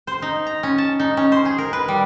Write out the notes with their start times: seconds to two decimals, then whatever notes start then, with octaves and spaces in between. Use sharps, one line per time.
0.07 C5
0.22 D#4
0.47 A#5
0.63 C#4
0.78 A5
1.00 D#4
1.17 C#4
1.32 C5
1.45 G#4
1.58 A#4
1.73 B4
1.88 G3